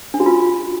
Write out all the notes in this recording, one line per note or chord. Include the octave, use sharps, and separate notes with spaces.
D4
F#4
F4